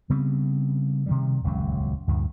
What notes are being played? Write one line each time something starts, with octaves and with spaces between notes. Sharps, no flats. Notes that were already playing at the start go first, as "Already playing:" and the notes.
C#3 G3 B3 C4
C3 D#3 G3
D#1 C#2 F#2 F#3
D2 G2 A#2